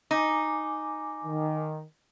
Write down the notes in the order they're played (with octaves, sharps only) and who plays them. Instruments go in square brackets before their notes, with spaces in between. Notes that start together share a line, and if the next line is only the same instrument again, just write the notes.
[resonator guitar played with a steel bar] D#4 [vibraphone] G#5 D6
[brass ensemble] D#3